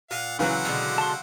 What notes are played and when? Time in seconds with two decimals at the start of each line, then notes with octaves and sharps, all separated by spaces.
0.11 A#2 F5 F#5
0.39 C#3 E3 F#3 C4 F#5
0.65 B2 D3 G#3
0.98 A5 C6